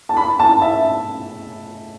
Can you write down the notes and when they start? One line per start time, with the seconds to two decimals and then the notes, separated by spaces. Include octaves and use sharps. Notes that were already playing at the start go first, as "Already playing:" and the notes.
0.09 A5
0.17 B5
0.40 A5
0.62 E5